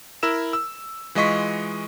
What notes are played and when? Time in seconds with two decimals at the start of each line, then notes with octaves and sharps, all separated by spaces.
0.23 E4 A#4 E6 E7
0.53 E6
1.15 E3 G#3 F4 D#5 C#6 B6